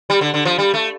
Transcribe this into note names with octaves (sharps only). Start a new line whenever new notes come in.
G3
D3
D3
F3
G3
A3